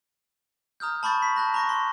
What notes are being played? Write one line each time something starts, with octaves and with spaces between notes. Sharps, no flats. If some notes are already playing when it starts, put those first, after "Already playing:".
A#5 D#6 F6 G6
A5 B5 C#6 G6 A6
B6
A5 F#6 A#6
A#5 C#6 A#6
A#5 C6